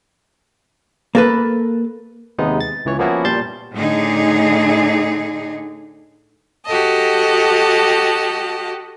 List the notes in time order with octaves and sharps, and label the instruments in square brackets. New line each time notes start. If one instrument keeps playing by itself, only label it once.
[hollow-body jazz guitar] A#3 A4 B4
[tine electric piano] D#2 C3 G#3 B3 D#4
A6
C#2 E3 C#5
F3 A#3 B3 C#4 E4 F#4
A#2 G3 A5 C6 G6 A6
[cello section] A2 D3 D#4 G#4
[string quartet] F#4 G4 A4 D#5 A5